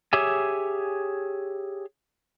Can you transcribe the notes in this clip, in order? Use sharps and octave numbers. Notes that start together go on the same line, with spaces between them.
G4 G#4 C#5 E5 G#5